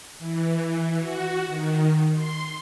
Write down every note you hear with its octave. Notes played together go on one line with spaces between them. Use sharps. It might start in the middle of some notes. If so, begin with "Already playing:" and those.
E3
F#4
D#3
C6